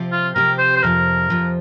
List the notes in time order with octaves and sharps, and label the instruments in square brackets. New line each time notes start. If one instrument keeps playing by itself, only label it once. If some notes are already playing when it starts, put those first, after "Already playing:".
Already playing: [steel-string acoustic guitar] C3 F3 C4 G4
[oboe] F4
[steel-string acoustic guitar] C3 F3 C4 G4 [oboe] A#4
[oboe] C5
C5
[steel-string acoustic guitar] F2 C3 F3 [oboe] A#4
[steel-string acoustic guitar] F2 C3 F3